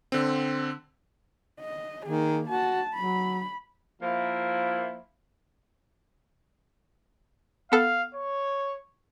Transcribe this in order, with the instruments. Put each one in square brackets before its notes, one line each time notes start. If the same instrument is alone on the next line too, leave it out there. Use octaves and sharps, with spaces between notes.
[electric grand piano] D3 C4
[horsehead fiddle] D#5
[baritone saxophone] D#3 [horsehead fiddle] A#3 G#4
[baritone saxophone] F#4 [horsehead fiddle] A5
[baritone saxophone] F#3 [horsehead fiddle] B5
[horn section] F3 A#3 E4
[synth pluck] B3 A4 [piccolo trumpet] F5
[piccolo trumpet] C#5